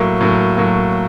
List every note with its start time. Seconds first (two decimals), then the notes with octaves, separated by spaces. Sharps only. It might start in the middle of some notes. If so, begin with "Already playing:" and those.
Already playing: A2 F#3 A#3
0.21 A2 F#3 A#3
0.57 A2 F#3 A#3